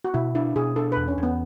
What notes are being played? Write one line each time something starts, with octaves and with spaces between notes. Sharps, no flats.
F#4
B2 E4
D4 E4
B2 G#4
D4 A4
B4
E2
C#4
E2
B3